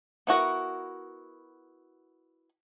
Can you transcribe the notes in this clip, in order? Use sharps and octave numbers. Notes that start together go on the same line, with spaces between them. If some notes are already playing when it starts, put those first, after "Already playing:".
B3 E4 F#4 A#4